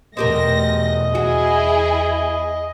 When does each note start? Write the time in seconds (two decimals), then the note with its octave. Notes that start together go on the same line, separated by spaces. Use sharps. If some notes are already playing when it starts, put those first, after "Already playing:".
0.17 E2 B2 A3 C4 G4 A#4 D#5 A#6
1.15 E2 E4 F#4 G#4